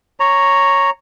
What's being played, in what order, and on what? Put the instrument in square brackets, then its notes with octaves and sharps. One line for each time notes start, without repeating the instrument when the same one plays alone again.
[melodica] C#5 A#5